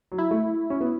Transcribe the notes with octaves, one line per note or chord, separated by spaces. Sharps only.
F#3
E4
A3
C#4
B3